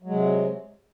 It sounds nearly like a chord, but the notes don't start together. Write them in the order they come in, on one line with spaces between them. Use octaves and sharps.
F#3 G#3 C3